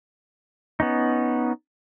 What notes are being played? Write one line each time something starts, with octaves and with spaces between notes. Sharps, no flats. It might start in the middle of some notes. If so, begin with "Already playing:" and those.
B3 C#4 D#4